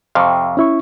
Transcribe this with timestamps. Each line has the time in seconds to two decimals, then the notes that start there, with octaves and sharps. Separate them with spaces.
0.15 F2 C3 F5 C#6
0.57 C#4 E4 C#6